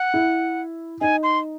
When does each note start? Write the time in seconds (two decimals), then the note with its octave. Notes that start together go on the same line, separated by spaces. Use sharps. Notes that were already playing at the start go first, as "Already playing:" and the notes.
Already playing: F#5
0.14 E4
1.01 D#4 G#5
1.23 C6